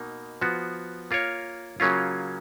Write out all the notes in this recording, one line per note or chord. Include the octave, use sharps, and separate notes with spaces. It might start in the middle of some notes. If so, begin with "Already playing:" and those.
Already playing: B2 A#3 D#4
F3 B3 F#4
A#3 F4 A#4 C#5
C#3 F#3 A#3 C#4 F4